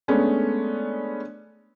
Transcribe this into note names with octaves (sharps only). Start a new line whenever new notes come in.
G#3 A3 B3 C#4 D4 G#4